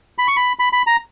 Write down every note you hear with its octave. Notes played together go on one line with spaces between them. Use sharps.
B5
C#6
B5
B5
B5
A#5